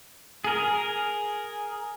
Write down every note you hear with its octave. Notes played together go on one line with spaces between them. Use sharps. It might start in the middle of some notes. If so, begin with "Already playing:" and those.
G#4 A#4